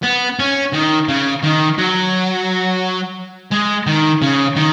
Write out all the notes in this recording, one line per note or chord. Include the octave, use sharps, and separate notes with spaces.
B3
C#4
D#3
C#3
D#3
F#3
G#3
D#3
C#3
D#3